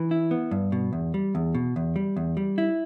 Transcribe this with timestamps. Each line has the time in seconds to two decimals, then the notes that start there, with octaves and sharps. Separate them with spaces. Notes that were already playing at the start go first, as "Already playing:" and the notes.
Already playing: E3
0.11 E4
0.31 B3
0.51 G2
0.72 B2
0.93 E2
1.14 G3
1.35 E2
1.55 B2
1.76 E2
1.96 G3
2.16 E2
2.37 G3
2.58 E4